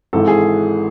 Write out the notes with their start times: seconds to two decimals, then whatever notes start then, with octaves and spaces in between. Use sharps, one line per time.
0.13 G#1 G#2 E3 A4
0.27 G#4